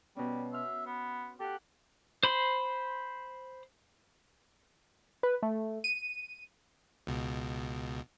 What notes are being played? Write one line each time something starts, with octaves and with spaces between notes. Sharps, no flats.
B2 G3 C#4
E5 C6 F6
B3
G4 A4 F#5
C5 B5 C6
B4
A3
D#7
C#2 B2